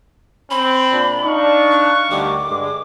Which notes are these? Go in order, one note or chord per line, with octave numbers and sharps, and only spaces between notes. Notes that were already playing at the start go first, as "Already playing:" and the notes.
C4 B5
A#2 D4
D4 D#4 F5 C#6
F#6
D2 D#3 G3 D6
G2 D3 G#3